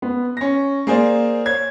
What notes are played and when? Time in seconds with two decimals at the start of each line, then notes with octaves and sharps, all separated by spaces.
0.02 B3
0.37 C#4 A#6
0.87 A#3 G#4 C5 D5
1.46 C#5 G#6